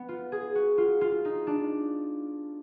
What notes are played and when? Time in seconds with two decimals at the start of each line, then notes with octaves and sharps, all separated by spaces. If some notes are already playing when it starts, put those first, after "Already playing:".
Already playing: B3
0.09 F4
0.32 G#4
0.55 F#4
0.78 F4
1.01 F4
1.25 D#4
1.47 D4